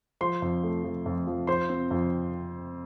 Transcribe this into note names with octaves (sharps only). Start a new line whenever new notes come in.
F3 C5 C6
F2
A3
F3
F2
F3
F3 C5 C6
C4
F2